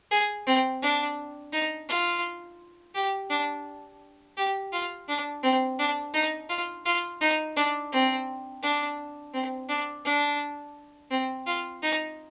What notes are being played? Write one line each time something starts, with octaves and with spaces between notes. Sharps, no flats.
G#4
C4
D4
D#4
F4
G4
D4
G4
F4
D4
C4
D4
D#4
F4
F4
D#4
D4
C4
D4
C4
D4
D4
C4
F4
D#4